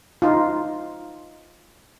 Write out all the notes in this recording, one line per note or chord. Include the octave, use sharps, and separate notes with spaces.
D#4 F4